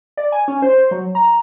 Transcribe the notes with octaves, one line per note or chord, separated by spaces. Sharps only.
D5
G#5
C#4
C5
F#3
A#5